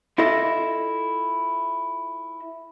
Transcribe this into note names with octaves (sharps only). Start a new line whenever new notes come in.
E4 F4 A4 D#5 E5